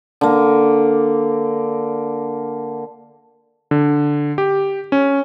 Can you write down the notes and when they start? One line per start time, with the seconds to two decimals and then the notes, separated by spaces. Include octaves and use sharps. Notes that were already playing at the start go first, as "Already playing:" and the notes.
0.21 D3 A#3
3.71 D3
4.38 G4
4.92 C#4